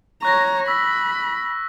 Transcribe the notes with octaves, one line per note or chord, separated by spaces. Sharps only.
C#5 A#5 C#6 F#6 A#6
B5 E6 B6